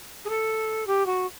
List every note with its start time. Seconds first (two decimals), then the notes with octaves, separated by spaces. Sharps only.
0.25 G#4
0.29 A4
0.87 G4
1.06 F#4